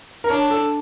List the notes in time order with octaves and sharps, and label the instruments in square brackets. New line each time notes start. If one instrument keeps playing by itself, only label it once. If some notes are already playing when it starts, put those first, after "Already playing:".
[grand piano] A#4
[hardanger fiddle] D4 [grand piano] C#5
[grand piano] A4